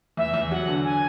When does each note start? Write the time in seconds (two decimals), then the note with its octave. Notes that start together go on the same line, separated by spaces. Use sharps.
0.17 E2 E5
0.34 E2
0.51 F#3 F#5
0.68 D3
0.84 G#5